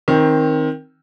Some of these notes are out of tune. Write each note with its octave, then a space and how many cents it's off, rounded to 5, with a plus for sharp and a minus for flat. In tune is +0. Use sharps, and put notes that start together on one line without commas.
D#3 +15 C4 +20